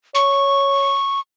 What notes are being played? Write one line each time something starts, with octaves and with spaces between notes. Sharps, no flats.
C#5 C#6